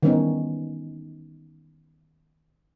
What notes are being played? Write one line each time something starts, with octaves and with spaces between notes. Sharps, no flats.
D#3 E3 G3 B3 C#4 D#4